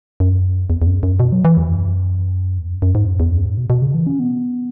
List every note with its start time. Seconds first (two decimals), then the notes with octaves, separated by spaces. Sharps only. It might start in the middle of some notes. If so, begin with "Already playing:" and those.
0.20 F#2
0.70 E2
0.82 E2
0.86 F#2
1.03 F#2
1.20 B2
1.32 F#3
1.45 E3
1.57 E2
1.70 F#2
2.58 E2
2.70 F#2
2.82 F#2
2.95 G#2
3.08 F#2
3.20 E2
3.32 F#2
3.44 G#2
3.57 B2
3.70 B2
3.82 C#3
3.94 E3
4.07 C#4
4.20 B3